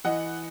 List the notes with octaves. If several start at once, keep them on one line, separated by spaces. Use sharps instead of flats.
E3 D#5 F#5